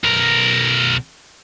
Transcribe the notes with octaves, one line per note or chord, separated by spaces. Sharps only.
B1 A#4